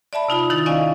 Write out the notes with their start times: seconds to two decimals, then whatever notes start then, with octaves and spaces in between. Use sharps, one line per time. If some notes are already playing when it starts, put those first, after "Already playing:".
0.13 D5 E5 A5 B5
0.29 C3 D#4 F4 B5
0.50 D#3 D#4 E4 A6
0.66 C#4 D5 D#5 F5 G#5